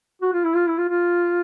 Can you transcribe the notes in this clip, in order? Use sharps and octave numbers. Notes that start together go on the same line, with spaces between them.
F#4
F4
E4
F4
E4
F4
F4